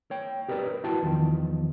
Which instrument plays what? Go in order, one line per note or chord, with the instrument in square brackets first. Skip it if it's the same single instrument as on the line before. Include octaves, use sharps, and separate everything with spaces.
[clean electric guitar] C#5 G5
G4 A#4 B4 D5
E4 F#4 B4 G5 A5
E2 D#3 F3